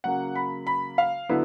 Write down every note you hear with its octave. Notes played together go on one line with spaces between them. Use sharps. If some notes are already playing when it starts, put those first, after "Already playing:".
C#3 F#3 A#3 F#5
B5
B5
F5
D3 F#3 B3 E4